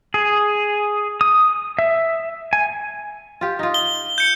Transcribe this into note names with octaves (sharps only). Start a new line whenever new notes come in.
G#4
D#6
E5
G#5
F4 G4
D#4 F4
G7
G6 C#7